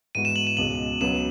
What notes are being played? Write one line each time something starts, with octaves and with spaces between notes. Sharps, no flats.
G#2 E3 G#3 B3 F#4 D#7
E7
F#7
E7
C#2 B2 G#3 F#7
C#2 C#3 F#3 B3 E7